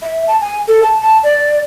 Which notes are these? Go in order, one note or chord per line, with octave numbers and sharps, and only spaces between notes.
E5
A5
G#5
A4
A5
A5
D5